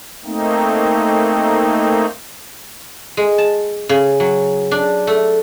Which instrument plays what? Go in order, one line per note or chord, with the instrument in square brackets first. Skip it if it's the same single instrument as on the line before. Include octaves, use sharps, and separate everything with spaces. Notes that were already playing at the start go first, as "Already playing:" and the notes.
[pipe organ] A3 A#3 C4 D#4
[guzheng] G#3
A5
C#3
F#3
D4
A3